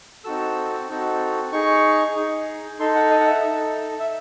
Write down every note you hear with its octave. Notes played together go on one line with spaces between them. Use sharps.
C4 D#4 F#4 A4 E6
C4 D#4 F#4 A4
D#4 G#4 C#6
D#4 G#4
D#4 A4 C6
F#5
D#5
F#5
E5
D#4 A4
E5